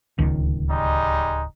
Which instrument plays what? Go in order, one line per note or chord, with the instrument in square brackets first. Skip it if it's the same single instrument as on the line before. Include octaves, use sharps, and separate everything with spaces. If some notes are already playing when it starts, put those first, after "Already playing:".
[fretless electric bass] D1 C#2 D#3
[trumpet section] G3 G#3 D#4